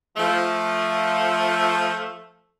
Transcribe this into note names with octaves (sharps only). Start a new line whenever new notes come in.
F3 A3